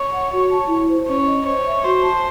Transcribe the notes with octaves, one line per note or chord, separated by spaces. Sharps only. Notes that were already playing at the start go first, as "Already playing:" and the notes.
Already playing: C#5
F#5
F#4
A5
E4
C5
C#4 C#5
D#5
C5 C#5
E5
F#4 C5
A5